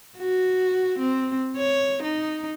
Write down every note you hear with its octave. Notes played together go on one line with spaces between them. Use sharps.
F#4
C4
C#5
D#4